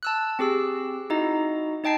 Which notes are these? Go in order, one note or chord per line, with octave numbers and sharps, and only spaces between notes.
A5 E6 F#6
C4 G4 G#4 E6
D#4 E4 F#4 D#5 A#5
D#4 D#5 G5 A5 C7